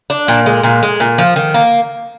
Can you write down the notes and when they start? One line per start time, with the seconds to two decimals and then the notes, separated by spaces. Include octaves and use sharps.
0.10 D4
0.28 A#2
0.46 G#3
0.63 A#2
0.83 G#3
1.00 A#2
1.18 F3
1.36 D#3
1.54 A#3